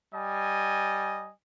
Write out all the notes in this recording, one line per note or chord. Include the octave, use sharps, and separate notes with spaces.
G3 D#5 G#5